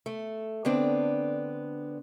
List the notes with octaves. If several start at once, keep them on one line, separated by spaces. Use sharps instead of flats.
A3
D3 B3 C4 D4